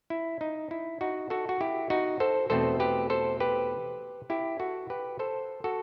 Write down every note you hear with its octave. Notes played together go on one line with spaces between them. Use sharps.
E4
D#4
E4
D#4 F#4
F#4 A4
F#4
E4 G4
D#4 F#4
A4 C5
E2 B2 A3 C4 A4 C5
G4 B4
A4 C5
G4 B4
E4 G4
F#4 A4
G4 B4
A4 C5
F#4 A4